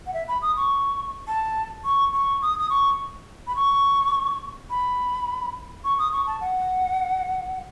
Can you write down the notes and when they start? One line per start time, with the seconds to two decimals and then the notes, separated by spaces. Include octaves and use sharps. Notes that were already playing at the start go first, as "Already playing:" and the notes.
0.07 F#5
0.14 E5
0.28 B5
0.42 D#6
0.57 C#6
1.28 A5
1.85 C#6
2.13 C#6
2.42 D#6
2.59 D#6
2.70 C#6
3.47 B5
3.56 C#6
4.70 B5
5.84 C#6
5.99 D#6
6.12 C#6
6.27 A5
6.41 F#5